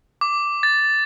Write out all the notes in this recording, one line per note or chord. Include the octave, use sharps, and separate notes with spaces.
D6
A6